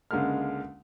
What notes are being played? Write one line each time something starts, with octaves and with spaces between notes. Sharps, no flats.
C#2 D3 G#3 A#3 F6